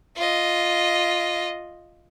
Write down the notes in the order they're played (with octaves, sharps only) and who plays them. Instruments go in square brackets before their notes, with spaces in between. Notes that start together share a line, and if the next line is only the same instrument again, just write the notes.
[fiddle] F4 D#5